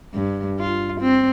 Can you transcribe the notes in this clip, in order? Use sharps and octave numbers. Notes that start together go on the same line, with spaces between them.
G2
F4
C4